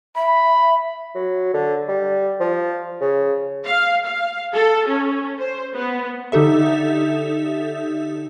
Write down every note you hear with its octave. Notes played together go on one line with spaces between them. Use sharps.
E5 B5
F#3
D3
G3
F3
C#3
F5
F5
A4
C#4
C5
B3
D3 D#4 G4 A4 E5